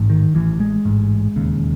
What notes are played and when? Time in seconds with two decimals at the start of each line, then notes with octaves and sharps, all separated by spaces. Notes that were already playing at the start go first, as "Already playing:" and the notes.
Already playing: A1 G#2
0.10 D#3
0.35 A1 A2 E3
0.60 G#3
0.85 A1 G#2
1.36 E1 D#2 C#3